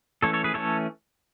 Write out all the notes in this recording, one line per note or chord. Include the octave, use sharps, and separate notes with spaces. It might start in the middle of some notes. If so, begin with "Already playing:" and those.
E3 A3 C#4 A4 C#5
A4 C#5
G#4 B4
E3 A3 C#4 A4 C#5